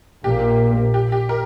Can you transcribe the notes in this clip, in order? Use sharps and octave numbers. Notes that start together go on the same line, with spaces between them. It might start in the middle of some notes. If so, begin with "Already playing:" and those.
A#1 A#2 A#3 G4
G4
G4
A#4